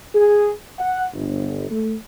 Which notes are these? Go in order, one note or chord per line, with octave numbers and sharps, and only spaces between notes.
G#4
F#5
G1
A3